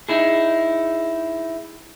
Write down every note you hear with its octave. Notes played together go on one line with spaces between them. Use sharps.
D#4 E4 G#4